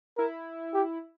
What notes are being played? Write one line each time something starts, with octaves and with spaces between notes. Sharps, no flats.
E4 A#4
G4